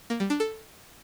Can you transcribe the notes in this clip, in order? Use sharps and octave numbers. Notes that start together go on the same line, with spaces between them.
A#3
G3
D4
A4